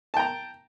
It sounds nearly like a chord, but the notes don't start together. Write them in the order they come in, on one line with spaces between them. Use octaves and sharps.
A5 G5 A#5